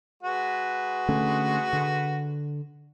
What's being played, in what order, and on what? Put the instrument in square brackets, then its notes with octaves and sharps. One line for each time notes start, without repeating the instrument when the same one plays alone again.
[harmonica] G#3 F#4 B4
[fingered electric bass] D3 A3 C#4
D3